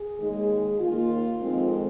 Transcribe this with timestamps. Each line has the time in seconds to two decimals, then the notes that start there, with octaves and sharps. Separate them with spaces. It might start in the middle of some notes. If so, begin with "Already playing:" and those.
Already playing: G#4
0.18 D#2 D#3 G#3
0.79 D#2 D#3 A#3 F4
1.41 F2 D#3 G#3 C4